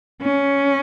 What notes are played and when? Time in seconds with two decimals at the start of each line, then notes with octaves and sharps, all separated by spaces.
0.22 C#4